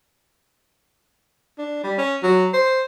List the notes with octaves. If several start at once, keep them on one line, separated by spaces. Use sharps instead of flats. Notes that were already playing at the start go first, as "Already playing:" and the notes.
D4
G3
C#4
F#3
C5